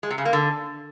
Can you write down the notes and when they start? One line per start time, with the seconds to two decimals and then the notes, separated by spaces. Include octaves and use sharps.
0.03 G#3
0.10 C3
0.18 C#3
0.25 A#3
0.33 D3